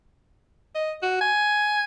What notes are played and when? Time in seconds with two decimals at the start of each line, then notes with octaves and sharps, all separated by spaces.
0.75 D#5
1.02 F#4
1.21 G#5